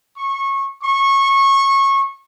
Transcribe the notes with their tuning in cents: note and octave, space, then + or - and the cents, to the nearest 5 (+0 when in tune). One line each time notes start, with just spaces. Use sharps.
C#6 -20
C#6 -20